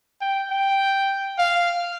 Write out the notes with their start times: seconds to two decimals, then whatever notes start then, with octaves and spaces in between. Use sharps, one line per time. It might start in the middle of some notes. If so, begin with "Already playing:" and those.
0.21 G5
0.51 G5
1.39 F5